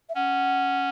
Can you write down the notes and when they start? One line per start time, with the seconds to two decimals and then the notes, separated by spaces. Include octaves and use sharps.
0.09 E5
0.15 C#4 F#5